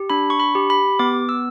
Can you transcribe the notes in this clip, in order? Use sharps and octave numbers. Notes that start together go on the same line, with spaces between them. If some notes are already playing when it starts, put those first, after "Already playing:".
Already playing: G4
D4 B5
C#6
B5
G4
B5
B3 D6
E6